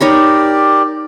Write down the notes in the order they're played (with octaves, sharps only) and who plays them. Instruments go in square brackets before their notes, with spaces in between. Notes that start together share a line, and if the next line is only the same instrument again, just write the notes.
[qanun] D#4 C#5 B5 [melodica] G4 A#4 D5